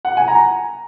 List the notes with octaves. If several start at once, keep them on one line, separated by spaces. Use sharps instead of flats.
F#5
G#5
A#5